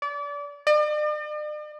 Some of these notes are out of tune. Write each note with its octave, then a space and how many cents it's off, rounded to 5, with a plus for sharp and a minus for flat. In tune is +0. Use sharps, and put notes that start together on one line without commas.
D5 -30
D5 +45